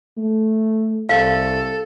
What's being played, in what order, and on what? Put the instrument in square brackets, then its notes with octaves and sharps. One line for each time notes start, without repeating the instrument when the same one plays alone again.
[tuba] A3
[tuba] C2 [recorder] A4 [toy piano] F5